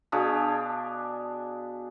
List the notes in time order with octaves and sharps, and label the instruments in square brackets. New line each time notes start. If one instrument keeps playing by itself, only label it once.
[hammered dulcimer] B2 D4 G#4 F5